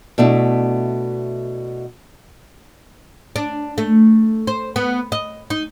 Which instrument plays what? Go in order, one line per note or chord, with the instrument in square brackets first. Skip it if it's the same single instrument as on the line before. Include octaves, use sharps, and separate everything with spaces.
[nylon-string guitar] B2 A3 D4 E4
[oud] D4
A3
C5
B3
D#5
D#4